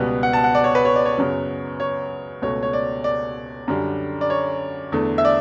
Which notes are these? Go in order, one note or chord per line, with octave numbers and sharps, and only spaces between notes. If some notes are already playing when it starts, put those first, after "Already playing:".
Already playing: C#2 B2 G3 B3
F#5
A5
F#5
D5
C#5
B4
C#5
D5
C#5
F#2 C#3 F#3 B3
C#5
C#2 B2 A3 C#5
C#5
D5
D5
F#2 D3 G3
D5
C#5
E2 D3 A3
E5
D5